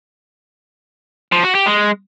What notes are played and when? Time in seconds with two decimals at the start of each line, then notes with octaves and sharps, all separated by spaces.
1.32 F3
1.44 F#4
1.55 G4
1.66 G#3